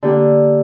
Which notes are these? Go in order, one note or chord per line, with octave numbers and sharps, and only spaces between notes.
D3 A#3 D4 G4